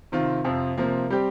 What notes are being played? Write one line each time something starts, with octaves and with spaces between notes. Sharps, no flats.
C3 D#3 C4 F4
F2 C3 F3
C3 F3 A#3
G3 C4 G4